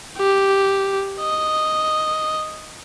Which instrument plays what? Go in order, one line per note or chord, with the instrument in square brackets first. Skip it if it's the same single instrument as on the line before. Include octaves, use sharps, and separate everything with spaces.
[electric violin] G4
D#5